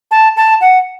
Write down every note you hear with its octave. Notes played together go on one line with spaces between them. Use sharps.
A5
A5
F#5